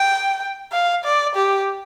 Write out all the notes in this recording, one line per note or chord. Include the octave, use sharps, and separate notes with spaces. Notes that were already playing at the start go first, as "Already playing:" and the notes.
Already playing: G5
F5
D5
G4